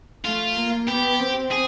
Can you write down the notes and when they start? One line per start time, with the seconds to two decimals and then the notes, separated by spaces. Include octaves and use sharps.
0.25 A3 F4
0.56 A#3
0.88 B3 G4
1.19 C4
1.51 G#4